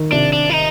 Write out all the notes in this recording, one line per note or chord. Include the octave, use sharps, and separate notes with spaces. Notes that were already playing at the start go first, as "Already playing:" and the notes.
Already playing: D#3
C3 D4
D4
E4
D#4